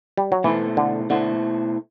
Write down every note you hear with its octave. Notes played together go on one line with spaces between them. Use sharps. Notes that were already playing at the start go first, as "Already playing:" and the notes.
G3
F#3
B2 E3 A3 E4 A4 C5
D3
B2 D3 A3 E4 A4 C5